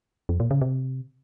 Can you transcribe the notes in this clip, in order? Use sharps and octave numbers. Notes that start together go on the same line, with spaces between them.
F2
A#2
C#3
C3